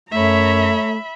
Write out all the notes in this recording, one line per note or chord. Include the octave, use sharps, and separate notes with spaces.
F#2 A3 C#5 E5 A#5 B5